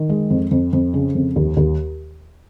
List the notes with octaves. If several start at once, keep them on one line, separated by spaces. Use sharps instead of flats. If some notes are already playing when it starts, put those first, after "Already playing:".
Already playing: D#3
G#3
F2
F2
F2
C#3
F2
D#2
D#2